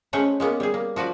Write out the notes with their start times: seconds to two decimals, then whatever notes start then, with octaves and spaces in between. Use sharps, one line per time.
0.13 G#3 A3 C#4 B4 C5 F#5
0.40 G#3 A#3 B3 C#4
0.60 G3 G#4
0.74 A#3
0.96 F3 F#4 B4 D5